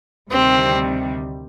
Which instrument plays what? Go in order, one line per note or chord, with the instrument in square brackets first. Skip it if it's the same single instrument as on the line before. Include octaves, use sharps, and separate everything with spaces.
[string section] D2 C3 D#3 G3 [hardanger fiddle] C4